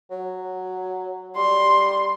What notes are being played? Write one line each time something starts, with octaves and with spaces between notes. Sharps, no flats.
F#3
G3 C6